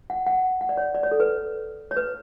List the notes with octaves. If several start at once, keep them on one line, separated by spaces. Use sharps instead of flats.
F#5
F#5
F#5
D5
C#5
D5
C#5
A4
B4
C#5
B4